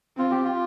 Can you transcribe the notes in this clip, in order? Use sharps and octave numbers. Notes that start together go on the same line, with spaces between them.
C4 F4
G4
F4